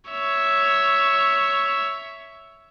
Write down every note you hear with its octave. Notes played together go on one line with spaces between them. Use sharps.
C#5 E5